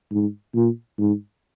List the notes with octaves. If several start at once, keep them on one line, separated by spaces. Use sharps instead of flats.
G#2
A#2
G#2